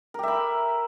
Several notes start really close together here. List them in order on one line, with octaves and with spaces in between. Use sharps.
A#4 G4 E5 B5